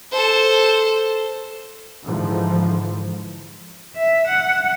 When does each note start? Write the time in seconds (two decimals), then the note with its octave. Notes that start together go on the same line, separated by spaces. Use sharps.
0.12 A4 C5
2.04 G#2 D3 E3 F3
3.96 E5
4.28 F#5